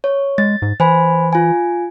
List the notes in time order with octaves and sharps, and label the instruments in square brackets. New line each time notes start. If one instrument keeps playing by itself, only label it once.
[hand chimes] C#5
[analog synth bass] G#3 [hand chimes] A6
[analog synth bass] G#2
[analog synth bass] E3 [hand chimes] C5 G#5 B5
[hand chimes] F4 G#5